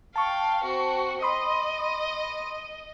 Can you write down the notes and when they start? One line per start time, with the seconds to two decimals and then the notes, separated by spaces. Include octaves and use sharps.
0.16 F5 G5 A5 C#6
0.64 C4 F#4
1.22 D#5 B5 C6 D#6